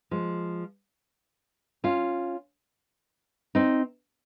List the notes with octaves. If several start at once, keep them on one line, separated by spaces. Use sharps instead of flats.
F3 G#3
C#4 F4
C4 D#4